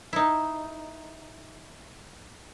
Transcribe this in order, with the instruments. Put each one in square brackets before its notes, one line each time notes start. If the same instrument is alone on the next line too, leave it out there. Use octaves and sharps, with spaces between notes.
[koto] D#4 E4